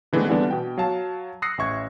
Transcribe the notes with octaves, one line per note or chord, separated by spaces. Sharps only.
D3 E3 G#3 A3 B3 C4
D3 E3 G3 B3 C4 D4
B2 G5
F#3 F5 A5
D#6 E6 F#6 A#6 C7 C#7
A1 E5 C#6 G#6